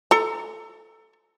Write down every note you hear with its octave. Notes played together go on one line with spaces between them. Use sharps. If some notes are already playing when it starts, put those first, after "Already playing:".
A4 A#5